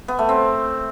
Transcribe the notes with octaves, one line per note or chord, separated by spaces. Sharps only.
B3
A3
C4